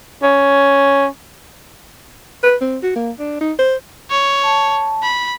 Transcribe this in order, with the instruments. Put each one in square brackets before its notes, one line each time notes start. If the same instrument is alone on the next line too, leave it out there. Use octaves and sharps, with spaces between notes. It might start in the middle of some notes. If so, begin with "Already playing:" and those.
[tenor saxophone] C#4
[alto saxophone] B4
C4
F#4
A#3
D4
D#4
C5
[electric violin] C#5
[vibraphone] A5
[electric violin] B5